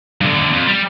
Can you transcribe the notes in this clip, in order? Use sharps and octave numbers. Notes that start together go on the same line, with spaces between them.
G2 D3
D#2 D3
F2
G3